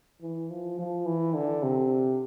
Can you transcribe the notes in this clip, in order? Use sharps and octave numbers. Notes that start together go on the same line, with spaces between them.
E3
F3
F3
E3
D3
C3